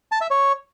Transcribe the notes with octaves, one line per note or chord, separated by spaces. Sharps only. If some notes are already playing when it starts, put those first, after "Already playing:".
A5
E5
C#5